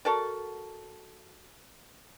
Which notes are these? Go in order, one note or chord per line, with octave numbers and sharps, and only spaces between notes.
F#4 A4 A#4 D5